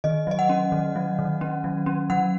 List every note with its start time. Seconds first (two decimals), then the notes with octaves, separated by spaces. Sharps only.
0.04 D#3 D#5
0.27 F#3 D#5
0.39 F#5
0.49 C#4
0.72 D#3
0.96 F#3
1.19 D#3
1.41 C#4
1.64 F#3
1.86 C#4
2.10 F#3 F#5